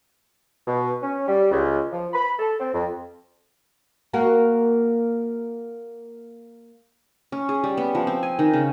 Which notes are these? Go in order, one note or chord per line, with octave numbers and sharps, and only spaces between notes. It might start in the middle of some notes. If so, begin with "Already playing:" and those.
B2
C#4
G3
C#2
F3
B5
A4
C4
F2
A#3 F#4 A#4
C#4
G#4
G3
B3
F3
C4
G#5
D#3
C#3